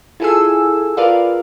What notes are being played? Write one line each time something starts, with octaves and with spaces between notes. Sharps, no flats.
E4 F4 G#4 A4 G#5 E6
F4 A#4 B4 D5 F5